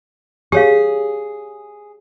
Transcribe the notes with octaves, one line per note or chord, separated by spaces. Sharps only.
G4 G#4 C#5 F5